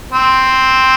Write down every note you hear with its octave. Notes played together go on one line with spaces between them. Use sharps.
C4